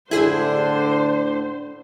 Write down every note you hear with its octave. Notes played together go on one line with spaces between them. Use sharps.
A2 D3 D4 E4 G#4 C5